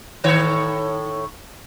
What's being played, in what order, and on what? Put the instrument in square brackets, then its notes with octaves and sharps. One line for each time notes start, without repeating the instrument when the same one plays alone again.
[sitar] A2 D#3 C#5